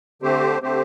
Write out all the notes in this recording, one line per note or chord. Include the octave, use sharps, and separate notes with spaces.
D3 A3 C4 G4 C5
D3 A3 C4 G4 C5